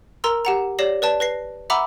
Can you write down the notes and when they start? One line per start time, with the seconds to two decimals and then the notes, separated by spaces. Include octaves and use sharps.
0.24 A#4 A#5 C6 E6
0.45 G4 F#5 A#5
0.79 G4 C#5 D5 A#6 C7 F#7
1.02 B4 D5 A5
1.20 B4 A#6 C7
1.70 E5 F#5 A#5 B5 D6 E6